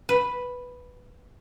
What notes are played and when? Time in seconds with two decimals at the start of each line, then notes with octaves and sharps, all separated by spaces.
0.09 B4